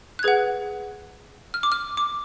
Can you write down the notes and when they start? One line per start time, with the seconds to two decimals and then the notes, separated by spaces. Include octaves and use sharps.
0.19 F#6
0.23 G#4 B4 F#5 G#6
1.54 F6
1.63 D6
1.72 F6
1.97 D6